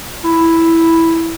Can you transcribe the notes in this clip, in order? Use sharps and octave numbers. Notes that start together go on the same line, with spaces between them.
E4